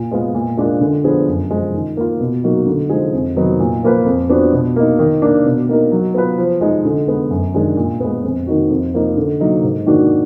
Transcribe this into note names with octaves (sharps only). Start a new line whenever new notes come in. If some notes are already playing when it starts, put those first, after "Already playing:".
Already playing: A#2
G#3 B3 F4
A#2
G#3 D4 F4 A#4
D3
F3 B3 D4 G#4
F#2
F3 G#3
D#3
A#3 F4
B2
F#3 A#3 D#4 F#4
D3
F3 G#3 D#4 G#4
F2
D#3 F#3 B3 D#4
A#2
F3 A#3 F4 B4
F2
F3 B3 D4 F#4
B2
A#3 D#4
D#3
A#3 D4
B2
A#3 D#4 A#4
F#3
B3 F4 B4
F3
G#3 D#4
D3
G#3 B3
F#2
D#3 G#3 D4 G#4
A#2
G#3 B3
F2
D#3 A#3 D#4 F#4
F2
F3 A#3 D#4
D3
F#3 A#3 D#4 A#4
G#2
D#3 A#3 D4 F#4